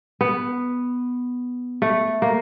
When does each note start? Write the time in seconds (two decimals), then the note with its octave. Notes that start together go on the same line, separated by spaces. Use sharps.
0.21 B3
1.82 A3
2.22 A#3